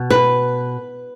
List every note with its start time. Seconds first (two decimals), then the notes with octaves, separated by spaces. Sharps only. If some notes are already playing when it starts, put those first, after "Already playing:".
Already playing: B2
0.10 B4